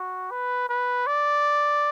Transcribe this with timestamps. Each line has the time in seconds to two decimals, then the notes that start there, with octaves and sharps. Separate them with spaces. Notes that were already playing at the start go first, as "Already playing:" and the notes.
Already playing: F#4
0.31 B4
0.69 B4
1.07 D5